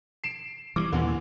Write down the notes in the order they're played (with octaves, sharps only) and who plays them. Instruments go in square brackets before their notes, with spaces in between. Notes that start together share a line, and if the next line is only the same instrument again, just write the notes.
[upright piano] C7 D7 E7
[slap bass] E3 F3 G3 [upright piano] D6
[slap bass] D#2 A#2 [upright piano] D3 E3